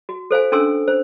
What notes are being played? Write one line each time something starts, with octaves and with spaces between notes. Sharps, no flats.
F#4
A4 C5 F5 G#5
C#4 D4 A4 G#5 C6 E6
C5